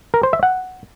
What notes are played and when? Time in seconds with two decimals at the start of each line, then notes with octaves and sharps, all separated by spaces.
0.14 A#4
0.23 C5
0.33 E5
0.43 F#5